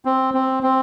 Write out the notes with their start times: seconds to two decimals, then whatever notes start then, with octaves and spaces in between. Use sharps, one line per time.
0.05 C4
0.34 C4
0.63 C4